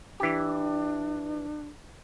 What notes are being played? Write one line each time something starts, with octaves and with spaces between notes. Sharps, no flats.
E3 D4 G4